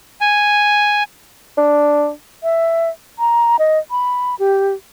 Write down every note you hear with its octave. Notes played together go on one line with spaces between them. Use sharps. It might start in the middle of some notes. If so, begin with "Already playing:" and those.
G#5
D4
E5
A#5
D#5
B5
G4